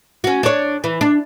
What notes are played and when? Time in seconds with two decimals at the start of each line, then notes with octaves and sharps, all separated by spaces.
0.24 C#4 F#4
0.43 D4 C#5
0.84 E3
1.01 D4